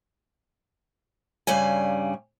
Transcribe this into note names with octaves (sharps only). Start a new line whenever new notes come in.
G2 C#3 G3 G#5